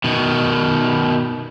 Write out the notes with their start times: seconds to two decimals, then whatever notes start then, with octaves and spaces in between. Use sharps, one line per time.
0.04 B2 D#3